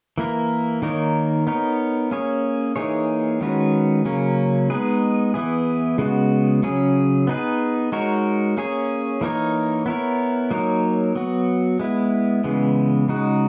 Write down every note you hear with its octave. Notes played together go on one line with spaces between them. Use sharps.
E3 A#3 E4 A#4
D#3 A#3 D#4 A#4 C#5
B3 D#4 A#4 C#5
A#3 C#4 G#4 C#5
E3 A#3 D#4 G#4 C#5
D#3 G#3 C#4 F#4 B4
C#3 F#3 A#3 C#4
G#3 B3 D#4 G#4 B4
E3 B3 E4 G#4
C#3 G#3 B3 F#4
C#3 F#3 C#4 G#4
B3 D#4 G#4 B4
G#3 D#4 F#4 A#4 C#5
A#3 C#4 G#4 C#5
E3 A#3 D#4 A#4 C#5
B3 E4 A#4 C#5
F#3 A#3 D#4 A#4 C#5
F#3 B3 F#4
G#3 B3 E4
C#3 E3 G#3 B3
C#3 G#3 D#4 F#4